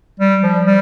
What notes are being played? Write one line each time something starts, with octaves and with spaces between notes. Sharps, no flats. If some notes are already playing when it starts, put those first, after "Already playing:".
G3
F3
G3